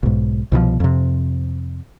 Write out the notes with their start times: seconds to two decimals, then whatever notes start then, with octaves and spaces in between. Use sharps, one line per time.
0.03 B1 G#2
0.52 C2 B2 D3 F3
0.80 F2 C3